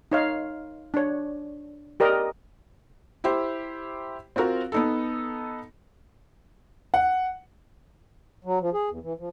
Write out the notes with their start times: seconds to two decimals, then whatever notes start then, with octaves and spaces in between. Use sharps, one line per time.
0.12 D#4 C#5 F5
0.94 D4 C#5
2.00 G4 A#4 D5 D#5
3.24 E4 G4 C5
4.36 C4 F4 F#4 A#4
4.72 B3 D#4 A4
6.94 F#5
8.44 F#3
8.61 F3
8.73 G#4
8.90 E2
9.03 E3
9.19 F3